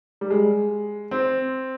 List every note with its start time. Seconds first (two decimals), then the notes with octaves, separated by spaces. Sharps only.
0.21 G3
0.30 G#3
1.11 C4